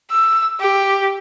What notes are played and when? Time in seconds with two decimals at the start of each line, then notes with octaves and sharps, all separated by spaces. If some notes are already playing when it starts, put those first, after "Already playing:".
0.11 E6
0.60 G4